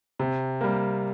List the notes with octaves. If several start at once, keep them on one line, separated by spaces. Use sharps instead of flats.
C3
G3 A#3